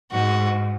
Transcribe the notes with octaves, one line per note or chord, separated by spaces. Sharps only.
G#2 F#4